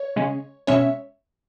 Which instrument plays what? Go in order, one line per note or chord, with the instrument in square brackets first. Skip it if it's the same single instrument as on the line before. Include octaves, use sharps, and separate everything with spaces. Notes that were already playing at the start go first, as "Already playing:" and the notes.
Already playing: [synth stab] C#5
C#3 G#3 C#4
B2 G#3 C#4 C#5 E5